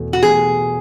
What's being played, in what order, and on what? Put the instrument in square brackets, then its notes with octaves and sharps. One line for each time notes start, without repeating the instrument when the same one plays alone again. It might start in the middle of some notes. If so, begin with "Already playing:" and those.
Already playing: [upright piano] E2 B2 A3
[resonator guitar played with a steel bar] F#4
[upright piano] E2 B2 A3 [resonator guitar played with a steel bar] G#4